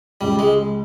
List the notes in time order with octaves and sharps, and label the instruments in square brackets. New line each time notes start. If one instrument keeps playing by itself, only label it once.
[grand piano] C#2 [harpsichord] G3
[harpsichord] G#3